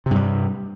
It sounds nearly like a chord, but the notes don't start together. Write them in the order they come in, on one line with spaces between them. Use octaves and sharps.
C3 G2 G3